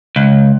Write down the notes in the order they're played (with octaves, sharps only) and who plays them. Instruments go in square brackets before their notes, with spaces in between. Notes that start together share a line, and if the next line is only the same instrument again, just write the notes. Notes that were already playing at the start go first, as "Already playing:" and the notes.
[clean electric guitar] C#2